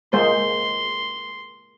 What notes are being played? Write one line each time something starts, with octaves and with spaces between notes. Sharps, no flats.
G#3 A#3 C5 C6